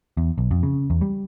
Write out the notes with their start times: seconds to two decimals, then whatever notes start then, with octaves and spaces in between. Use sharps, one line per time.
0.17 E2
0.38 B1
0.51 F2
0.63 C#3
0.90 E2
1.01 G3